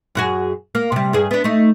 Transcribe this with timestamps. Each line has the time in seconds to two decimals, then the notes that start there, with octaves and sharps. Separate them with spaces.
0.15 F#2 F#4 G#4
0.75 A#3
0.92 C3 G3
1.13 G2 G#4
1.31 B3 D4
1.44 A3 D#4